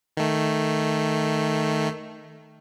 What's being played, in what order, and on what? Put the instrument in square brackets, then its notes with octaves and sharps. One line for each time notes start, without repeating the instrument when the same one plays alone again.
[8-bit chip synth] D#3 A3